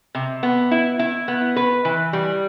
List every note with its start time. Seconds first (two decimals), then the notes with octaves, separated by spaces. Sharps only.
0.15 C3
0.43 B3
0.71 E4
0.99 E4
1.28 B3
1.56 B4
1.85 E3
2.13 G3